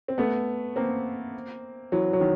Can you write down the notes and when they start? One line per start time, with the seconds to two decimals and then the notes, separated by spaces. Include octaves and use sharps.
0.08 C4
0.18 A3 B3
0.76 A#3 C4
1.92 E3 F#3
2.13 F#3
2.20 D#3